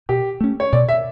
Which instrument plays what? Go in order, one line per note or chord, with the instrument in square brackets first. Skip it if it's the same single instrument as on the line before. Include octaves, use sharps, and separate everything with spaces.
[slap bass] B2 [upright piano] G4
[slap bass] A3 C#4
[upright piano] C#5
[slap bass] B2 [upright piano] D5
[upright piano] E5